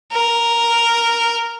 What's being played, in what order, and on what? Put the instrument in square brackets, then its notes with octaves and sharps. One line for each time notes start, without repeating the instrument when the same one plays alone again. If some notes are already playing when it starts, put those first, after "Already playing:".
[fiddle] A#4